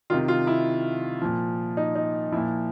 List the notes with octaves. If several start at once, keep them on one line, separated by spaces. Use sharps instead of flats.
C3 D#3 F4
F4
E4
A#2 F3
D#4
D#4
A#2 F3 E4